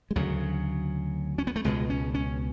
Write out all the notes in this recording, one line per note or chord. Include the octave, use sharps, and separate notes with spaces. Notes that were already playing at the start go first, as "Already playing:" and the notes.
G#3
D2 C#3 F#3
C#4
B3
A3
C#2 B2 G#3
C#4
C#4